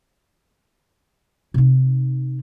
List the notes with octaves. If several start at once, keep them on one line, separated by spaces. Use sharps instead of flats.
C3 D#4